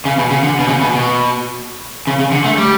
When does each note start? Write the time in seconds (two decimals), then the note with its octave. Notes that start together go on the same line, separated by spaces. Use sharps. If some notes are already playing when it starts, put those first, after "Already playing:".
0.05 C#3
0.18 B2
0.31 C#3
0.43 D3
0.59 B2
0.69 C#3
0.81 B2
0.94 B2
2.07 C#3
2.19 C#3
2.32 D3
2.45 A3
2.57 G3